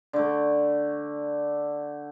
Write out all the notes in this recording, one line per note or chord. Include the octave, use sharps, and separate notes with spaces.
D3 A3